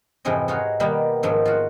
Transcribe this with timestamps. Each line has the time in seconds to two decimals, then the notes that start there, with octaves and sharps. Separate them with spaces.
0.25 F2 G#2 C3 E3 F3 D#5
0.48 D#4 F4 F#4 G#4 C#5
0.80 B2 D#3 G3 A#3 B3 G4
1.23 G#2 D#3 F3 F#3
1.45 F4 F#4